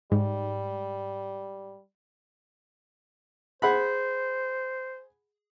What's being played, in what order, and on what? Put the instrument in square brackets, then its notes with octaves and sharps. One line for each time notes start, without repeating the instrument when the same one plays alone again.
[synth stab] G#2 [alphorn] G3
[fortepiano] G#4 F#5 B5 [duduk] C5